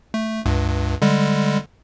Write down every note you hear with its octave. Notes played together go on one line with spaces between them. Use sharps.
A3
C#2 G2
D3 G3 G#3